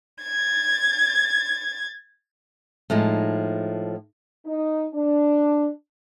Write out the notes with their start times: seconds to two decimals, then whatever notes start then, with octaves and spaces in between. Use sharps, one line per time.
0.24 G#6 A6
2.90 A2 F3 G#3 D#4
4.46 D#4
4.94 D4